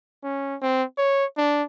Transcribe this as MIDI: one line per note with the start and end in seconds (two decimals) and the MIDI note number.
0.23 0.56 61
0.62 0.83 60
0.98 1.25 73
1.37 1.63 62